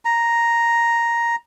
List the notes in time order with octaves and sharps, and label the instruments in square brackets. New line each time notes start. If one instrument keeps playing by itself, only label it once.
[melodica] A#5